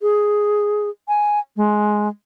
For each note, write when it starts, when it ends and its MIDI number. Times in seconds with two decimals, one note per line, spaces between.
0.01 0.89 68
1.08 1.39 80
1.56 2.08 56